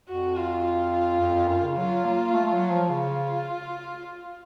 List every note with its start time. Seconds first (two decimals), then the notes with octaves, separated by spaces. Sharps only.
0.08 F2 F#4
0.36 F4
0.65 F4
1.20 F2
1.35 F2
1.48 F#2
1.63 C#3
1.77 F#3 F4
2.05 A#3
2.33 A3
2.47 A3
2.52 F#3
2.70 F3
2.89 C#3 F4